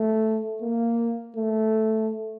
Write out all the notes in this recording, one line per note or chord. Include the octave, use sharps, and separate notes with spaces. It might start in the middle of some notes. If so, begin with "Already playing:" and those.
Already playing: A3
A#3
A3